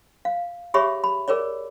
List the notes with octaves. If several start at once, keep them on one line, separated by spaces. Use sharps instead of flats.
F5
G4 G#4 C#5 E5 B5 C#6
B5
G#4 A#4 B4 C#5 D5